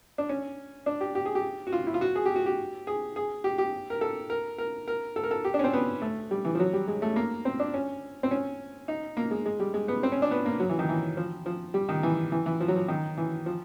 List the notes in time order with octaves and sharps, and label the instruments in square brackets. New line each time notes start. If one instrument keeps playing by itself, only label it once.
[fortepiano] D4
C#4
D4
G4
G4
G#4
G4
F#4
F4
E4
F4
F#4
G#4
G4
F#4
G4
G#4
G#4
G4
G4
A#4
A4
A#4
A#4
A#4
A4
A#4
A4
G4
D4
C#4
C4
B3
A3
G3
E3
F3
F#3
G3
G#3
A3
A#3
C4
D4
C#4
C4
C#4
D#4
A#3
G#3
G#3
G3
G#3
B3
C4
C#4
D4
B3
A#3
F#3
E3
D#3
E3
F3
F3
G3
D#3
E3
E3
E3
F3
F#3
F3
D#3
E3
F3